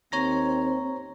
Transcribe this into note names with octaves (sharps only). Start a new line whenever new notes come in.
D#2 C4 C#5 A#5 A#6